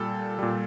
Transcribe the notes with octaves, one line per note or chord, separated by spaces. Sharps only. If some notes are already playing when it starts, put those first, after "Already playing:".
Already playing: A#2 G3 A4
A#2 G3